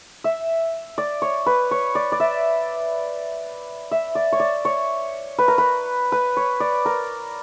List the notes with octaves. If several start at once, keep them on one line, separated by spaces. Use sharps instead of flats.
E5
D5
C#5
B4
C#5
D5
D5
E5
E5
D5
C#5
D5
C#5
B4
A#4
B4
B4
C#5
D5
A#4